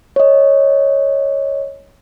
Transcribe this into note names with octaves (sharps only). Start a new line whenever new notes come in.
C#5 D#5